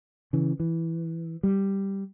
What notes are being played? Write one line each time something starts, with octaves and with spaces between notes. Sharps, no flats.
C#3 E3
E3
G3